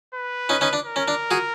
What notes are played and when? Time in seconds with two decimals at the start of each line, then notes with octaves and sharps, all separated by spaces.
0.15 B4
0.49 C#4 D#4
0.61 C#4 D#4
0.73 D4
0.85 A#4
0.96 C#4
1.08 D4
1.31 F#4 G#4